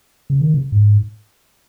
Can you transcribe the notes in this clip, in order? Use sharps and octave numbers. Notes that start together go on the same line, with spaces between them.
C#3
D#3
C#3
G#2